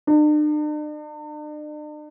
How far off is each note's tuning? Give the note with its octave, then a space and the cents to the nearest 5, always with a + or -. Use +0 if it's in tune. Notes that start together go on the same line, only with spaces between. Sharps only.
D4 +45